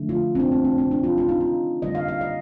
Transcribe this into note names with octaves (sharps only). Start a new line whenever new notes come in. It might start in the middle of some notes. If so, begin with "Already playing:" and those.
Already playing: D3 F3 A3
F4
C4
D4
C4
C4
C4
D4
F4
F4
D#4
F4
D3 G3 A#3 D#5
F5
F5
D#5